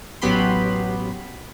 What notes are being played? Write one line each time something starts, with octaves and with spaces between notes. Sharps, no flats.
A1 F#3 B3 G4 B5 C6